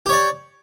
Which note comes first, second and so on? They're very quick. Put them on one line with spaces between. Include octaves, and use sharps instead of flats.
G4 C#5 D5